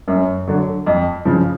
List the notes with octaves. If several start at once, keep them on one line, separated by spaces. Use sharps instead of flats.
F#2
D3 F#3
F2
C#3 F3